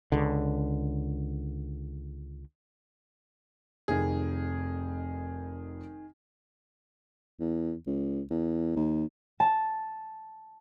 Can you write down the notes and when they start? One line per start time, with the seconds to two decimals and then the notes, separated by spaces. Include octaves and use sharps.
0.12 C#2 D3
3.88 F1 F2 D#3 G#4
7.40 E2
7.87 C#2
8.30 E2
8.76 D#2
9.40 A5